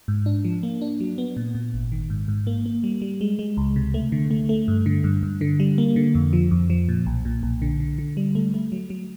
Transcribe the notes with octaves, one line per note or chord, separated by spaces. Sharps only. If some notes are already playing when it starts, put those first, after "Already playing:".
G#2
D4
F3
A#3
D4
F#3
B3
A#2
A#2
G#1
D#3
G#2
G#2
A#3
A#3
G3
G3
G#3
G#3
C#2
C3
A3
D3
A3
A3
G2
D3
G2
G2
D3
G3
A#3
D3
F2
F3
F2
F3
A#2
B1
A#2
B1
D3
D3
D3
G3
A3
A3
F#3
F#3